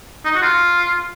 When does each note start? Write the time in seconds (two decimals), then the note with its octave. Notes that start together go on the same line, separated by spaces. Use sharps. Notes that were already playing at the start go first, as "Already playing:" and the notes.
0.25 D#4
0.35 F#4
0.42 F4